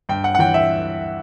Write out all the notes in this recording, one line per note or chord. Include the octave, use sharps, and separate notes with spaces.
G2 G5
F#5
F#5
E3 G5
E5